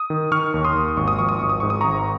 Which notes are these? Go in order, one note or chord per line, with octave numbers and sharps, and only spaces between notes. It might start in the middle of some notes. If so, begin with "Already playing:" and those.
Already playing: D#6
D#3
D#3 C#6 F6
D#2
C6 D#6
D#2
G#1 C#6
D#6
F3 C#6
D#6
G#1 C#6
D#6
G#2 C#6
D#6
G#1 A#5 C#6